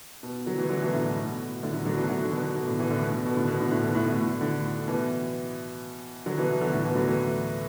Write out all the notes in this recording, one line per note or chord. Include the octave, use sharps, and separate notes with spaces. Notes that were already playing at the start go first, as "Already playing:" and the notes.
B2
D3 F#3
E3 A3
D3 F#3
B2 E3
A2 D3
B2
B2
A2 D3
D3 F#3
D3 F#3
B2 E3
D3 F#3
D3
B2
B2
B2
A2 D3
B2 E3
A2 D3
B2
B2
A2 D3
B2
A2 D3
A2 D3
B2 E3
A2 D3
B2
A2
A2 D3
B2 E3
D3 F#3
B2 E3
B2
D3 F#3
A2 D3
B2 E3
D3 F#3
E3 A3